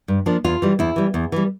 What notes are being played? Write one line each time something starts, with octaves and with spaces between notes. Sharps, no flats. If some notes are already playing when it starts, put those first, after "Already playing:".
G2
F3 A#3 D4
E2 F4
E3 G3
E2 E4
E3 G3
E2
E3 G3